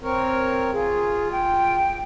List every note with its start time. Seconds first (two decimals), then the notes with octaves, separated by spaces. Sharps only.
0.02 C4 A#4 C#5
0.73 F4 G#4
1.32 G5